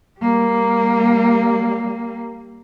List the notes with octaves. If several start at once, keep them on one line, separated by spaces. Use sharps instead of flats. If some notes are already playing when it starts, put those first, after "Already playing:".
G3 A#3